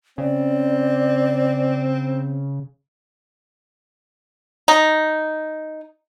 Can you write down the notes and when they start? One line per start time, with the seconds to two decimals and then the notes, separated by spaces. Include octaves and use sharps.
0.18 C#3 C4 D5
4.68 D#4